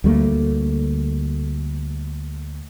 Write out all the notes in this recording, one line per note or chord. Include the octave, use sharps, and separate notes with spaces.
D2 G3 A3 A#3